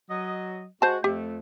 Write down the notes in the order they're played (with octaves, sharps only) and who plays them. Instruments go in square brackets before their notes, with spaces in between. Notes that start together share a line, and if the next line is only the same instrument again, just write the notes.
[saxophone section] F#3 D#5
[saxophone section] G#3 F#4 [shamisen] C5 A5
[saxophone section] F2 A3 [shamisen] G4